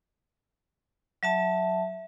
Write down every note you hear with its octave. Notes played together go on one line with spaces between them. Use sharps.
F#3 E5 A5